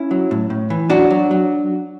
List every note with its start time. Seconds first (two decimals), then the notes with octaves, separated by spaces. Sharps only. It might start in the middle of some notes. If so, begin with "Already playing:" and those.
Already playing: C#4 E4
0.11 F#3
0.31 A2
0.50 A2
0.70 E3
0.90 F#3 D4 F#4
1.11 F#3
1.31 F#3